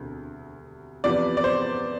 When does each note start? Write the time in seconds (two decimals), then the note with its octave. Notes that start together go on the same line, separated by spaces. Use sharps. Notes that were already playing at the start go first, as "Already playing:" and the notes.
Already playing: E1 D2 C3
1.04 E2 C3 F3 B3 D5
1.37 D5
1.44 C5